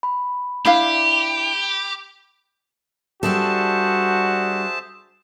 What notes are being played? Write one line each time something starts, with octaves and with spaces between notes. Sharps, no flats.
B5
D4 E4 G4 F5 B5
G3 D4 F#4 G#4 A4 C5 E5 A5